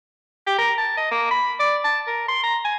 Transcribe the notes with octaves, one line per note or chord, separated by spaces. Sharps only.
G4
A#4
A5
D#5
A#3
B5
D5
A5
A#4
C6
A#5
G#5